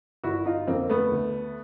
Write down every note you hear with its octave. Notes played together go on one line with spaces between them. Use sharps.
G1 E4 F#4
D#4 F4
F2 D3 A#3 C4
A3 B3
D2